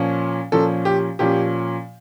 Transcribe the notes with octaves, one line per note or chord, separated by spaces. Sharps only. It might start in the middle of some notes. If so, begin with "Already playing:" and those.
Already playing: A#2 F3 C#4
A#2 F3 C#4 A4
G4
A#2 F3 C#4 G4